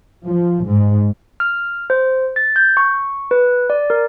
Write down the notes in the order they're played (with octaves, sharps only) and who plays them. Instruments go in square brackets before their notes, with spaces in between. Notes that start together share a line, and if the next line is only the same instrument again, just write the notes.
[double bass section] F3
G#2
[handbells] F6
C5
A6
G6
C#6
B4
D5
A#4